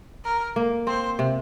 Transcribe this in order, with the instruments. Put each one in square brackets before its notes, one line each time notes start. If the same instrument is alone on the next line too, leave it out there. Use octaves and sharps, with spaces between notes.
[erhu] A#4
[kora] A#3
[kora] C4 [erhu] C5
[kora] C3